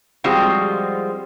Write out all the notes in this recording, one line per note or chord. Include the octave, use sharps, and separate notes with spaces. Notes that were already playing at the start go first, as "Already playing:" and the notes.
F3 G3 G#3 C4 F4 F#4